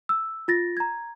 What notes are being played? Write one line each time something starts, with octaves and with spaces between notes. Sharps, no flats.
E6
F4 A6 A#6
A#5 G#6